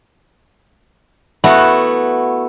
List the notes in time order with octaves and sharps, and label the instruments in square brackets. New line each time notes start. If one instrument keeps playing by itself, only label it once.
[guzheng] A3 B3 E4 F#4